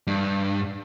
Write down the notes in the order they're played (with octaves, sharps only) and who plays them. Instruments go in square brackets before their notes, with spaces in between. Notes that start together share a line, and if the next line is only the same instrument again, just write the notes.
[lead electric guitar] G2